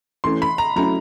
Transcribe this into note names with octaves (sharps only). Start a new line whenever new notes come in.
E3 A3 C#4 C6
B5
A#5
F#3 A3 C#4 E4 A#5